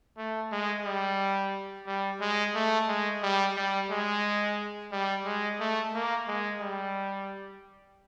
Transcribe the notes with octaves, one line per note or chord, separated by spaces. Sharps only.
A3
G#3
G3
G3
G#3
A3
G#3
G3
G3
G#3
G3
G#3
A3
A#3
G#3
G3